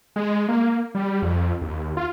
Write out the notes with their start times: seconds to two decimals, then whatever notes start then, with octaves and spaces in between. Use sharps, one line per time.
0.16 G#3
0.48 A#3
0.95 G3
1.22 F2
1.62 D#2
1.97 F4